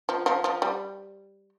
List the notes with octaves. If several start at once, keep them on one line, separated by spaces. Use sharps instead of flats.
F3
F3
F3
G3